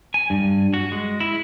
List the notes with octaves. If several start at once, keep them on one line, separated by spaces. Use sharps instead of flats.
G#5
G2
F#4
G#3
E4